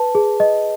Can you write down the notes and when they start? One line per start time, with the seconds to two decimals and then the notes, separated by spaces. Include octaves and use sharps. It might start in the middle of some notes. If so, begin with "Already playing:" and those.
Already playing: B4 A5
0.15 G#4
0.40 D#5